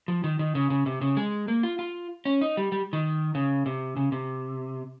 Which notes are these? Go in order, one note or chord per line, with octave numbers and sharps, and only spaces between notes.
F3
D#3
D#3
C#3
C#3
C3
C#3
G#3
A#3
F4
F4
C#4
D#4
G3
G3
D#3
C#3
C3
C#3
C3